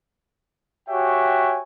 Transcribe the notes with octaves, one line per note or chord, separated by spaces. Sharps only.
F#4 G4 C#5 E5 G5 G#5